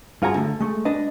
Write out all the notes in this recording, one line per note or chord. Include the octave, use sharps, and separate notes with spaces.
G2 F4 F#4 G#4 A#5
D3 A3
G#3 A3
D4 B4 D#5